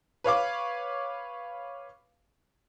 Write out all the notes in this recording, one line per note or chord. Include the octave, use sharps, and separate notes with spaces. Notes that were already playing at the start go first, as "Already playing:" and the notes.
B4 C#5 F5 D6